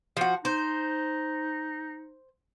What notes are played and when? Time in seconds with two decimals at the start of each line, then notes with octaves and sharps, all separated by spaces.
0.17 F3 F#4
0.45 D#4 C5